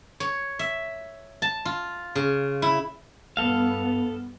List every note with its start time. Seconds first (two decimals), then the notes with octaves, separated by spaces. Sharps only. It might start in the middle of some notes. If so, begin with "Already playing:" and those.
0.20 C#5
0.59 E5
1.42 A5
1.65 F4
2.15 C#3
2.62 E4
3.37 G2 B3 A4 F5